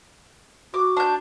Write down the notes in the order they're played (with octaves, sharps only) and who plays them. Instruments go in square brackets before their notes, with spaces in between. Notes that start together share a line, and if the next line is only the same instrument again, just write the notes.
[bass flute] F#4 [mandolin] D6
[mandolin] D4 G6